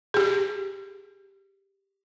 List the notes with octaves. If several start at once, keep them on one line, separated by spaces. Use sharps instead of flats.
G4 G#4